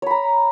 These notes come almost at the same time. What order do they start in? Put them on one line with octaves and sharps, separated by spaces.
C#5 B5 A#5